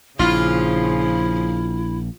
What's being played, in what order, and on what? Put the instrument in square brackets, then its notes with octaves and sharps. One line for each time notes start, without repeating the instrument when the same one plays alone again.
[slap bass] A#1 [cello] C#3 F3 [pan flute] E4 [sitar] F4